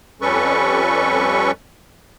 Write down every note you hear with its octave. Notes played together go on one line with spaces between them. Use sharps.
F2 G3 C#4 A4 B4 C#6